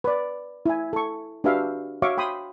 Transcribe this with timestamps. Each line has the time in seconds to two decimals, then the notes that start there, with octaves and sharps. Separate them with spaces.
0.04 B4 D5
0.66 E4 G#5
0.93 A4 C#6
1.44 D4 F#4 G4 B4 E5 F5
2.02 F#4 C#5 E5 F5 C#6 D6
2.18 G5 B5 C6 D#6